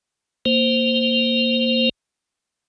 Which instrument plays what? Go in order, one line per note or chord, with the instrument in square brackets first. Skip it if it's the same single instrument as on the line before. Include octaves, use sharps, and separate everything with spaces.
[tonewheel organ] A#3 C5